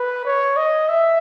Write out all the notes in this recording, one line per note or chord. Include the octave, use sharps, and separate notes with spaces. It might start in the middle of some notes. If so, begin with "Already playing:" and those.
Already playing: B4
C#5
D#5
E5